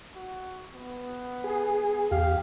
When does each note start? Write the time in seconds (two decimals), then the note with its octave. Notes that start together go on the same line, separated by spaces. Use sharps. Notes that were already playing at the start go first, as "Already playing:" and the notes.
0.16 F#4
0.75 B3
1.44 G#4
2.11 E2 G4 F5